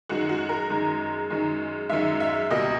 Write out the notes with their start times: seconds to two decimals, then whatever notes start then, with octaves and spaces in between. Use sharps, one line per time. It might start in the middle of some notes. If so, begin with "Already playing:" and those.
0.09 F#2 D#3 G#3 F#4
0.29 F#4
0.49 A#4
0.70 F#2 D#3 G#3
1.30 F#2 D#3 G#3
1.89 F#2 D#3 G#3 E5
2.20 E5
2.50 C#2 B2 G3 A#3 D#5